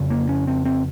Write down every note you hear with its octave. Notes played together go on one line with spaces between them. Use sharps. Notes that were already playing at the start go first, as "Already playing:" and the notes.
Already playing: F2 C#3
A#3
C#4
C4
C4